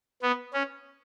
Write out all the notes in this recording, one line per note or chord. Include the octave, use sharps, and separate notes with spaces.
B3
C#4